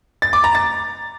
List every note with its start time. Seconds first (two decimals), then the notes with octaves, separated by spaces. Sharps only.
0.22 A6
0.33 D6
0.44 A#5
0.55 A6